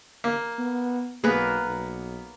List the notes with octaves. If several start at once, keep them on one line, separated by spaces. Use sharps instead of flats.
A#3
B3
B1 A#3 B3 G#4 A#4 B4
B1